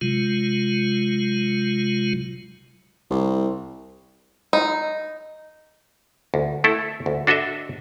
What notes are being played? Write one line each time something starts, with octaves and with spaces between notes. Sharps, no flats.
C3 F#3 G#3 F4
C2
D#4
D2
A3 E4 A4
D2
D4 F#4 A4 D#5 E5